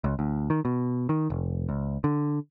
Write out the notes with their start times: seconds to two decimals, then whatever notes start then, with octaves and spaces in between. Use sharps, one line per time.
0.04 C#2
0.19 D2
0.50 D#3
0.65 B2
1.09 D#3
1.30 F1
1.69 C#2
2.04 D3